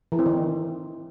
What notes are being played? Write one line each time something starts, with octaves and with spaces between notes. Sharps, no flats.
E3
C4
D#3